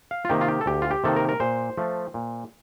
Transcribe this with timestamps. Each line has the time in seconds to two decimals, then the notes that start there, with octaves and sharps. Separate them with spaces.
0.11 F5
0.25 F4
0.29 C3 D#3 A#3 D#4 G4
0.41 F4
0.48 G4
0.61 A4
0.66 D2 G4
0.82 F4
0.91 G4
1.04 C3 D#3 A#3 D#4 A4
1.16 A#4
1.29 A#4
1.40 A#2 C5
1.77 F3 A3
2.14 A#2